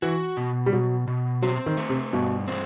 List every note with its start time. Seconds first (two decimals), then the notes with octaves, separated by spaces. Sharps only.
0.02 E3 F#4
0.37 B2
0.66 G3
0.73 B2 F#3
1.07 B2
1.42 F#3 C4
1.66 D#3
1.77 A3
1.89 C3
2.13 G2 B2
2.48 C4